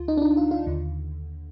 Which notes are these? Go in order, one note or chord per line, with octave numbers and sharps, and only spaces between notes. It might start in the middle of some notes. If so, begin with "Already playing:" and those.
Already playing: D2 D3 F4
D#4
D4
D#4
F4
F4
D#2 D3